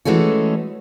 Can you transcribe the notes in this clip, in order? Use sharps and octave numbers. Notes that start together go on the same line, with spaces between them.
E3 G#3 A3 C#4 F#4